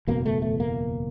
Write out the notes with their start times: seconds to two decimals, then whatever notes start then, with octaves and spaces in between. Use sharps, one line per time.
0.07 F#1 E2 B2 A#3
0.26 A3
0.42 A3
0.60 A#3